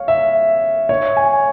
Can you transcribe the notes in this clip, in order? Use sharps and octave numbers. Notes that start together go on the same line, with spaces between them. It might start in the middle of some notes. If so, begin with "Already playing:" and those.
Already playing: C#5 F5
E5
C#5
G#5